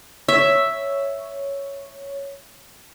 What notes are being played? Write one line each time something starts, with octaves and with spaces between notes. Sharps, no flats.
C#5 E5